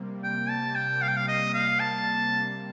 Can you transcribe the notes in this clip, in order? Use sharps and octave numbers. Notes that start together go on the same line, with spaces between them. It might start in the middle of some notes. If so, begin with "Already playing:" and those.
Already playing: C3 G3 A#3
G5
A5
G5
F5
G5
F5
D#5
F5
A5